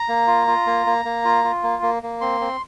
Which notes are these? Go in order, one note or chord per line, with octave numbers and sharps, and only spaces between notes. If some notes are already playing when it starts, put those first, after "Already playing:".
Already playing: A#5
A#3
F4
F4
A#3
A#3
A#3
F4
F4
A#3
A#3
A#3
C4 C6
C4